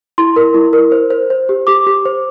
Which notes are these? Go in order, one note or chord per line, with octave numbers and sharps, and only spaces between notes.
E4 C6
A#4
E4
A#4
C5
C5
C5
G4
G4 D6
G4
C5